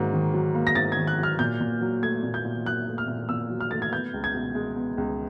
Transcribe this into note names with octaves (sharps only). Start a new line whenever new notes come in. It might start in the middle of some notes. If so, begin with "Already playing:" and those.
Already playing: G#2 D#3 F#3 A#3
D#3
F#3
A#3
A#6
G#2 A6
D#3 G#6
F#6
F#3 F6
A#2 G6
A#2
F#3
A3 G#6
A#2
G6
A#2
F#3 F#6
A3
F6
A#2
A#2 E6
F#3
F6
A3 A6
G#6
B3 G6
C#2
G#6
B2
G#3
B3
C#2